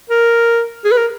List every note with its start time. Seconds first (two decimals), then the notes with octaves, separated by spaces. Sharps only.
0.09 A#4
0.84 G#4
0.92 B4
0.97 A#4